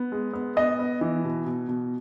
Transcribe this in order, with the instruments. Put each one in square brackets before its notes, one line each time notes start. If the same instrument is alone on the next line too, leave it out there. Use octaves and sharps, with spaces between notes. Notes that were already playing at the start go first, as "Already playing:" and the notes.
Already playing: [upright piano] B3
G#3
B3
B3 D#5
B3
E3
B2
B2
B2